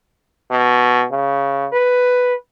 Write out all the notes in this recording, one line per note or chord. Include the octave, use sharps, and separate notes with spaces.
B2
C#3
B4